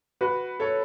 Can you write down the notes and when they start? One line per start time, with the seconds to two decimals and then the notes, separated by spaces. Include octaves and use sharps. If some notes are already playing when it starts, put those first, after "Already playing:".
0.21 F#4 B4
0.60 A4 C#5